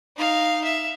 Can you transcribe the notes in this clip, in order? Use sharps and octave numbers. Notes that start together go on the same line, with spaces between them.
D#4 F5
E5